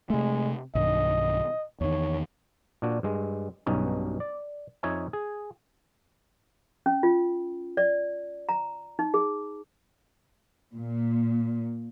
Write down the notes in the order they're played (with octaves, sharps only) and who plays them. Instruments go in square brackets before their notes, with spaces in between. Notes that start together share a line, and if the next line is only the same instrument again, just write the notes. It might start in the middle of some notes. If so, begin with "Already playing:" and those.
[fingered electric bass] C3 A3 [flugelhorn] G#3
[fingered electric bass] B1 G2 D#3 [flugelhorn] D#5
[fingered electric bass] E2 D#3 [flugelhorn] C#5
[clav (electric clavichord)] A#2 D4 F#4
G2 G#3
B1 G2 B2 C#4 D#4
D5
F2 D#4 C#5 E5 G#5
G#4
[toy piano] C#4
F4
D5
A#5
D#4
G#4
[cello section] A#2